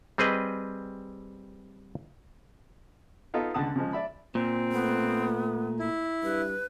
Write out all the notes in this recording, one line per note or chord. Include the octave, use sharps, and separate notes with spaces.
G3 C4 G#4 B4 D#5
B3 D#4 F4 A4
C#2 D3 F#5 A5 D#6
C#3 F3 G#3
D5 E5 B5
A#2 C4
A3 B3
E4
G2 B4